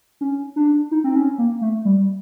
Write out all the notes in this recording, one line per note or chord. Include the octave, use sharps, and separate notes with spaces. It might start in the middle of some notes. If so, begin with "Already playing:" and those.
C#4
D4
D#4
C4
C#4
A#3
A3
G3